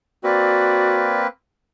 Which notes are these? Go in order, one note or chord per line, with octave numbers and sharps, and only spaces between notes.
A#3 C4 F#4 B4 D5